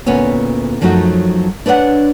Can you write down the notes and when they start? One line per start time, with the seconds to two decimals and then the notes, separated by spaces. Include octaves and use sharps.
0.06 D2 A#2 B3 C#4 C#5 G#5
0.81 F#2 F3 F#3 A3 D#4 F#4
1.66 D4 B4 C#5 D#5 F#5